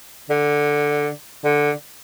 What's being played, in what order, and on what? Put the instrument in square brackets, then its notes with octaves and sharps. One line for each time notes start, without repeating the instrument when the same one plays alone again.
[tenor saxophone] D3
D3